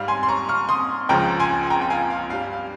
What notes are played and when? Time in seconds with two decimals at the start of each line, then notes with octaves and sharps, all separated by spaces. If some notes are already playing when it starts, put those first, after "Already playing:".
Already playing: G#2 G3 F5
0.08 G#5 C6
0.23 C6
0.28 A#5 C#6
0.49 C#6 F6
0.69 C6 D#6
1.09 C#2 C#3 F3 G#3 G5 A#5
1.40 G#5 C6
1.70 G5 A#5
1.81 G5
1.90 F5 G#5
2.10 F5
2.30 G2 G3 F5
2.53 F5